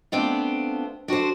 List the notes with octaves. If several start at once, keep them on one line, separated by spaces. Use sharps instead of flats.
A3 B3 C4 D4 F4
D4 F#4 A4 C5